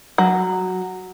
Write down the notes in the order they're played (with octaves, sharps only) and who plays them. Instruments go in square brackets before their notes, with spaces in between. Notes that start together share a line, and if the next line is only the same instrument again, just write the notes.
[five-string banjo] F#3